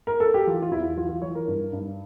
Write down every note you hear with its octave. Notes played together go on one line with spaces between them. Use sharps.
A#4
A4
G4
E3 F4
F4
E2 E4
E3 F4
F4
E3 C#5
A#4
G2
G2